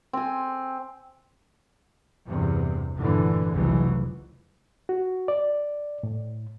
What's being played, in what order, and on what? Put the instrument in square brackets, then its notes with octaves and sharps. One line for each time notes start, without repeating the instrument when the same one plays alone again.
[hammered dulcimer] C4 G#5
[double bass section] E2 G2 C3
F1 G2 A#2 D3 E3
F1 C2 C#3 E3 F#3
[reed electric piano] F#4
D5
A2